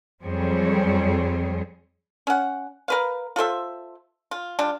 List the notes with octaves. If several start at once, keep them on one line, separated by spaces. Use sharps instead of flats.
F2 F#3 G3 C4 G#4 C#5
C#4 F#5
A#4 B4 F5
F4 A4 C5 E5
F4
G3 D4 F4